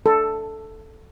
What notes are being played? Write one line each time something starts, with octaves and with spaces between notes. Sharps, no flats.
A4